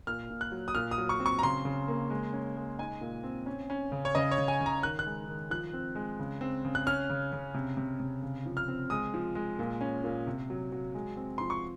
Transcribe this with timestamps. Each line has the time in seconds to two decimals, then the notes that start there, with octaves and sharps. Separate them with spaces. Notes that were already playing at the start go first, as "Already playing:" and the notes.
0.07 A#2 F6
0.30 A#2
0.41 F#6
0.52 F#3
0.68 D#6
0.75 A#2 F6
0.91 D#6
0.98 F#3
1.09 C#6
1.20 C4
1.26 C#6
1.39 A#5
1.43 C#3 C6
1.65 C#3
1.88 A#3
2.10 G#3
2.33 C#4
2.57 G#3
2.79 D#4 G#5
3.01 A#2
3.24 C4
3.46 C#4
3.70 C#4
3.92 C#3
4.05 C#5
4.15 C#3 D#5
4.31 C#5
4.38 C#3
4.48 G#5
4.61 C#3
4.66 A#5
4.83 D#3 F#6
4.99 F#6
5.06 G#3
5.29 D#3
5.50 F3 F#6
5.73 C4
5.95 G#3
6.19 C#3
6.41 C4
6.65 C#3
6.75 F#6
6.86 C#4 F6
7.10 C#3
7.32 C#3
7.54 C3
7.77 C3
8.00 C3
8.22 C#3
8.46 F3
8.57 F6
8.68 C4
8.90 G#3 D#6
9.14 F3
9.35 G#3
9.59 A#2
9.81 C#4
10.04 A#2
10.27 C3
10.50 F#3
10.72 F#3
10.95 G#3
11.17 C4
11.38 F3 C6
11.50 C#6